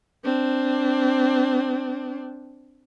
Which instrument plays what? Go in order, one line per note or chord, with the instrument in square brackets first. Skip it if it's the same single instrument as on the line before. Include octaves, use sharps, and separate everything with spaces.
[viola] C4 D4